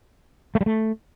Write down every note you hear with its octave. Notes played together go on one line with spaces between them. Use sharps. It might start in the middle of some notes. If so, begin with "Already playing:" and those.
A3
G3
A3